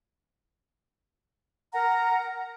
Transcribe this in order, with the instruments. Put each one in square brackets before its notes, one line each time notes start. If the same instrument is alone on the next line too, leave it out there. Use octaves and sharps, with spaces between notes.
[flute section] A#4 F#5 A#5